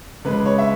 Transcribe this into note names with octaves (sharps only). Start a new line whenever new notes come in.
C#2 C#3 G#3 B4
C#5
E5